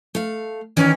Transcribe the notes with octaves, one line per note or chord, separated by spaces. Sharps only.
A3 F5
D#3 E3 C#4 D5